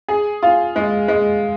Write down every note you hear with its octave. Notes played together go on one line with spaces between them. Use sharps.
G#4
F4
G#3
G#3